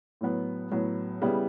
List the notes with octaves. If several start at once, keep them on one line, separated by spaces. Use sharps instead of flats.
A2 F#3 B3
A2 F#3 B3
C#3 G3 B3 E4